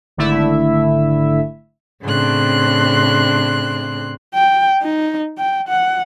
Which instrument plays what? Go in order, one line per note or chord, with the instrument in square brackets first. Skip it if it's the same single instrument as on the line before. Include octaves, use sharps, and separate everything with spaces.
[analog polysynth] G#1 D3 A3 E4 E5
[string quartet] A2 C#3 C4 D4 C6 F#6
[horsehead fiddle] G5
D#4
G5
F#5